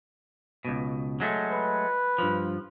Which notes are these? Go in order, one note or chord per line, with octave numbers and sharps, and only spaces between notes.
C#2 B2
F#3 G#3 A3
B4
G2 F3